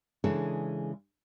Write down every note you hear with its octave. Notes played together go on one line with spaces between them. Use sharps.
C#3 E3 G#3 D4 G#4 A4